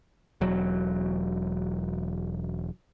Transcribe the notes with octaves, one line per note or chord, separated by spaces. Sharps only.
E1 F#3